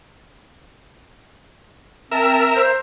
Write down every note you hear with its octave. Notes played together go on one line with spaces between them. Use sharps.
C4 A#4 E5 A5
C5